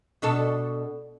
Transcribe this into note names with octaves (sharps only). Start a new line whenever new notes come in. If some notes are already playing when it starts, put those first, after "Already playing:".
B2 D4 A4